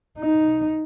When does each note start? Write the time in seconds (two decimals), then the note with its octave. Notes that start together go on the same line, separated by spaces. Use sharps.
0.19 D#4